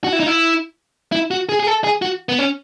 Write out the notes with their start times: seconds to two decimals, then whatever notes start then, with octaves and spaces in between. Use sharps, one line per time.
0.04 F#4
0.13 E4
0.20 D#4
0.26 E4
1.12 E4
1.31 F#4
1.49 G#4
1.60 G#4
1.67 A4
1.84 G#4
2.02 F#4
2.29 B3
2.39 C#4